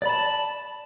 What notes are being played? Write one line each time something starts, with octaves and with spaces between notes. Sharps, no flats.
D5 A5 B5